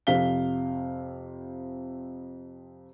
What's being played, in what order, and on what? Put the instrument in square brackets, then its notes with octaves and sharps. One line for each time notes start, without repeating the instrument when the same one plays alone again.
[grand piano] F2 C3 F5 B6 G7